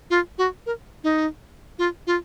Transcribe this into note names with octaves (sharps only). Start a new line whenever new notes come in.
F4
F#4
A#4
D#4
F4
F4